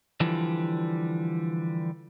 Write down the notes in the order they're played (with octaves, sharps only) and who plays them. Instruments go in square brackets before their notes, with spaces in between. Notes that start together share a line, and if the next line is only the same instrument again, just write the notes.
[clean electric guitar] D3 E3 F3 G3